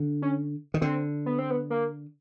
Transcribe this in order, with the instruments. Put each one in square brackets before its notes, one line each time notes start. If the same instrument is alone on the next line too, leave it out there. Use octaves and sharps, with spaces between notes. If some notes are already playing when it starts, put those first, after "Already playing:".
Already playing: [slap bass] D3
[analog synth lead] C#4
[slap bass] D#3
[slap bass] D3 [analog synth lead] C4
[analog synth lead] B3
C4
B3
A#3